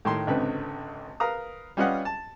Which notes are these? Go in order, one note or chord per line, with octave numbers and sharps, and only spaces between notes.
A2 D#3 C6
G#1 C#2 D3 C4 B4
A#4 B4 F5 A#5 D#6
G3 C#4 F4 B4 D#5 F#5
A5